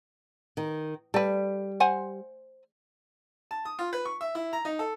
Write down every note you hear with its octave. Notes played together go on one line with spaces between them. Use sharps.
D#3
G3 A4 B4
C5 F#5 G#5
A5
D#6
F4
B4
C#6
E5
E4
A#5
D#4
A4